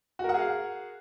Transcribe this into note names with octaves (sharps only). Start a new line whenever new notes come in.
F#4 G#4 A#4 F5 F#5